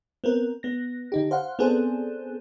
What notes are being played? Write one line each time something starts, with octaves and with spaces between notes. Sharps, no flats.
B3 C4 A#4
B3 A#6
D3 D#4 G4
C5 F5 F#5
B3 C4 D4 G#4 A4 C5